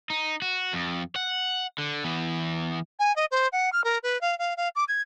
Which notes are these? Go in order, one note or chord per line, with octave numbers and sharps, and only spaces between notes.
D#4
F#4
F2
F#5
D3
E3 B3
G#5
D#5
C5
F#5
F6
A#4
B4
F5
F5
F5
D6
G#6